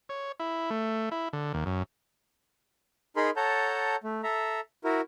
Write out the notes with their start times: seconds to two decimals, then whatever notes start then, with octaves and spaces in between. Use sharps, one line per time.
0.09 C#5
0.40 E4
0.70 A3
1.11 E4
1.33 D3
1.54 D#2
1.66 F#2
3.17 D#4 G#4 A#4 B5 C6
3.36 A4 C#5 F#5 A5 A#5 G6
4.04 A3
4.23 A4 E5 A#5
4.84 E4 F#4 A#4